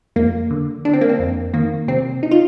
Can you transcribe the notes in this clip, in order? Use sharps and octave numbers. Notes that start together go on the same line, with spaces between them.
F2 A#3
D3
D3 D4
C4
A#3
C4
F2
D#3 A#3
C3 C4
D#4
F4